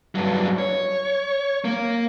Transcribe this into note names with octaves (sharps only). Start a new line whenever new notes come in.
G2 F#3
C#5
A#3